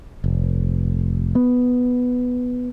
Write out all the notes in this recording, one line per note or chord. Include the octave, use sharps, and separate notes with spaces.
F1
B3